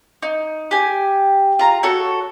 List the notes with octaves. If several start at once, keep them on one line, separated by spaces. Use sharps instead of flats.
D#4
G4 G#5
F4 A#5
F#4 A4 C#5